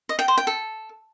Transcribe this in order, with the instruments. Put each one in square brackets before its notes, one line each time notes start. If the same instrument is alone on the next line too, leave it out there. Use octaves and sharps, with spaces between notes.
[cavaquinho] D#5
G5
C5
G5
A4